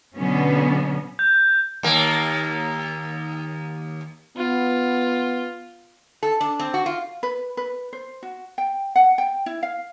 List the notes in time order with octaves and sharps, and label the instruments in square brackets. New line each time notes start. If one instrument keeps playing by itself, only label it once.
[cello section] B2 D3 F#3 B3 C#4
[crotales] G6
[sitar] D#2 A#3
[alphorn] B3 [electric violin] F4
[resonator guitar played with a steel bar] A4
D4
C4
F#4
F4
[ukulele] B4
B4
C5
F#4
G5
F#5
G5
E4
F5